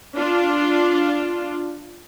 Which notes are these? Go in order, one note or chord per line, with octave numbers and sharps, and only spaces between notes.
D4 F4